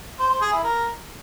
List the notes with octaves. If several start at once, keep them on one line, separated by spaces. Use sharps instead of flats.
C5
C5
G#4
E4
A#4